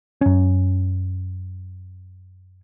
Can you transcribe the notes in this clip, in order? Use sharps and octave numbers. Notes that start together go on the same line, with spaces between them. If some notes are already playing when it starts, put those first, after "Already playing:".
F#2 C#4